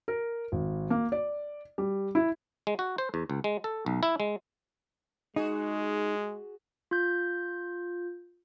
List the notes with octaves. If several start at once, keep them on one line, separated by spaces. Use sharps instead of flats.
A#4
G#1
A#3
D5
G3
E4
G#3
F#4
C5
E2
C#2
G#3
A4
B1
E4
G#3
G#3 D#4 F#4 G#4
F4 G6